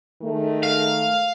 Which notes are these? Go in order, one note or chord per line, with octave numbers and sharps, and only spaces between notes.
D#3 G#3 A3
F5